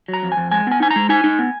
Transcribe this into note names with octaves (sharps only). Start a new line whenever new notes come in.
F#3
A#5
F2
G#5
F2
G#3 G#5
B3 G#5
D#4 G#5
A#5
G#3
D#4 G#5
D#4
B3